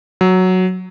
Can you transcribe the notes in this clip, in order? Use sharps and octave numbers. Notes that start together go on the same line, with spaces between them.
F#3